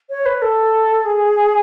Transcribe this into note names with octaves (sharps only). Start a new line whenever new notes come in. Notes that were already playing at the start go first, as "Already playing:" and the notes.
C#5
B4
A4
G#4